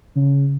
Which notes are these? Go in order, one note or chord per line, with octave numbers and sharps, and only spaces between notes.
C#3